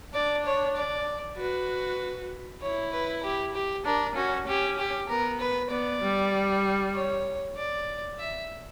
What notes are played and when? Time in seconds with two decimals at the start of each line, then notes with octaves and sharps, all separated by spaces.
0.14 D4 D5
0.45 C#5
0.76 D5
1.38 F#4 B4
2.62 E4 C#5
2.92 B4
3.23 G4
3.54 G4
3.85 D4 A#4
4.16 C#4 F#4
4.47 C#4 G4
4.78 G4
5.09 B3 A#4
5.40 B4
5.71 B3 D5
6.02 G3
6.94 C#5
7.57 D5
8.18 E5